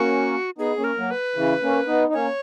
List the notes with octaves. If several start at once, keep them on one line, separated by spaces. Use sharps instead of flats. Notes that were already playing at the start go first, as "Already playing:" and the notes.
Already playing: A#3 C#4 F#4
B3 D#4 G#4
A#3 C#4
A#4
F#3 A#3
B4
C#3 E3
A#3 C#4
B3 D#4
D#4
A#3 C#4 C#5